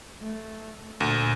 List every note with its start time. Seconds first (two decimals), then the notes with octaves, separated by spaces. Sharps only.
0.22 A3
1.00 D2 A#2